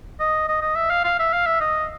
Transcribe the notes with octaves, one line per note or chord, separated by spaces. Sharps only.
D#5
D#5
D#5
E5
F5
F5
E5
F5
E5
D#5